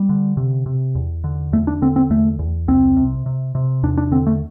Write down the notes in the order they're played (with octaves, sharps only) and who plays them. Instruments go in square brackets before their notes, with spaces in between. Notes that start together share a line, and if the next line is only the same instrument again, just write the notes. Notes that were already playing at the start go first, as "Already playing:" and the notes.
Already playing: [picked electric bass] G3
D3
C3
C3
E2
D3
E2 A3
D4
D3 C4
C4
E2 A3
E2
C2 C4
C3
C3
C3
E2 D4
D4
D3 C4
A3